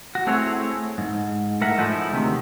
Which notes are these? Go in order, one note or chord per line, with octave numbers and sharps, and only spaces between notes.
F#4
A3 C4 E4 G#4 C#5
G#2
A2 A#4 E5 F#5
F3 G#3 A3 C#4 D#4 E4
D2 C3 D#3